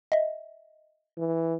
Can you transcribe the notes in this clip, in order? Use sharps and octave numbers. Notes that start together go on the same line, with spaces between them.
D#5 E5
E3